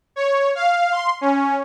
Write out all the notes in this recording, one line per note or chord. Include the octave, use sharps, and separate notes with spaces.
C#5
F5
C6
C#4